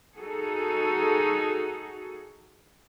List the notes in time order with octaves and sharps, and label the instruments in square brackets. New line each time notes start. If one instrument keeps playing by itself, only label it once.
[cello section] D#4 F#4 G#4 A4